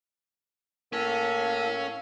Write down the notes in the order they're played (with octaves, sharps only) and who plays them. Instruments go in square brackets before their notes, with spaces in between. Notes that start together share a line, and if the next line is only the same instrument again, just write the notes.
[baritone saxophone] A2 [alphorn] A#3 [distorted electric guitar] C#4 [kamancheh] F5 E6